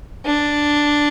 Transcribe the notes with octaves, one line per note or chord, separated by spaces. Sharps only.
D4